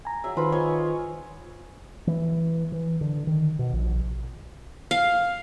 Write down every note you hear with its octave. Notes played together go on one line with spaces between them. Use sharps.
G#5 A#5
F#3 G#4 E5
D#3 F4 B4 C5 B5
C#5 D#5 G#5
E3
E3
D3
D#3
B2
A#1
F5